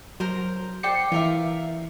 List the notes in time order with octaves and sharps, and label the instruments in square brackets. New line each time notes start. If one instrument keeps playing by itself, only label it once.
[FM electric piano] F#3 [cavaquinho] A#4 C5
[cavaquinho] C5 D5 G5 [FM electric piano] C#7
[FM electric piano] E3 [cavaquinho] F4 A#4 E5